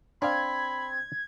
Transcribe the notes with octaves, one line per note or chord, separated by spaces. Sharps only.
C4 D4 D5 F5 B5 G#6